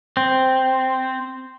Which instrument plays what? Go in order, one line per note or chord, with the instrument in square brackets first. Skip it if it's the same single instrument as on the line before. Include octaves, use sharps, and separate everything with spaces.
[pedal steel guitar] C4